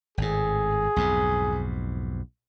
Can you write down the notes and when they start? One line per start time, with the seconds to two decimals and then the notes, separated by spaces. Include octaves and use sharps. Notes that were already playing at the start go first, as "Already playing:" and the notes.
0.18 G#1 A2 G#4
0.96 B1 F2 G#2